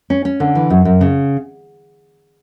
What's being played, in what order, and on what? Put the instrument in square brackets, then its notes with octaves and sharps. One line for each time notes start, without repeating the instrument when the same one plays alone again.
[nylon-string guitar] C#4
C#4
D3
E3
F#2
F#2
C#3